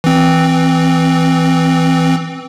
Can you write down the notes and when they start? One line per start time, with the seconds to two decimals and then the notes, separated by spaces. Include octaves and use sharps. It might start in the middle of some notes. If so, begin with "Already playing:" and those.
0.04 E3 C4